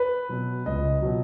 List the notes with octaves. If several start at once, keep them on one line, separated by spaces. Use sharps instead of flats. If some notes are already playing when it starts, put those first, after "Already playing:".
Already playing: B4
B2 F#3
C#2 D#5
B2 F#3